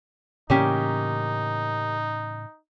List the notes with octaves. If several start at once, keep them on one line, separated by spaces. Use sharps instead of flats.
A2 C#3 E3 A#3 C#4 D#4 G4